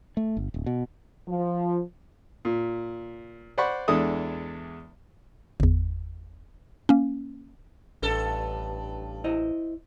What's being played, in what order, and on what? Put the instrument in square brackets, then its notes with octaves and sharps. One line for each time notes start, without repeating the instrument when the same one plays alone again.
[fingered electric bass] A3
G1
D1
B2
[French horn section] F3
[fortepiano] A#2
C5 D5 F#5 B5 C#6
E2 G#3 D4 A4 E5 D#6
[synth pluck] G1 E2
A#3 C#4
[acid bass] A1 [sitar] G2 A4
[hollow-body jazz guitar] E4 C5 D#5